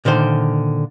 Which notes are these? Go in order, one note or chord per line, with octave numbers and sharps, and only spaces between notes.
A#2 D3 D#3 C5